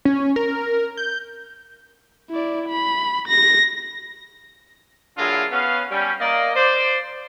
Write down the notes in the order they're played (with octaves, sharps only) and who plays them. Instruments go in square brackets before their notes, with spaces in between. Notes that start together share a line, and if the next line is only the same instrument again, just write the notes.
[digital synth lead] C#4
A#4
G6
[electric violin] E4 D5
B5
A#6
[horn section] D3 F#3 G#3 A#3 E4 F4
B3 C#4 F5
G3 C#4
A#3 D5 D#5
C5 D5